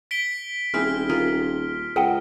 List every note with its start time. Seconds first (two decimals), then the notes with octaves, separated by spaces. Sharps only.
0.11 B6 D7 G7
0.74 D#1 C4 E4 G#4 F6
1.09 F4 G#4 A#4
1.96 C#2 G#4 D#5 F#5 G5